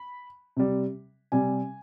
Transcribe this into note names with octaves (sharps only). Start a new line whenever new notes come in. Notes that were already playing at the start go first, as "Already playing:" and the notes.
Already playing: B5
C3 G3
C3 G3 G#5